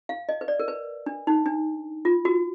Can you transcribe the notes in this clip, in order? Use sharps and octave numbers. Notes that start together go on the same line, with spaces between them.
F5
D#5
B4
D5
A#4
B4
D4
D#4
D4
F4
F#4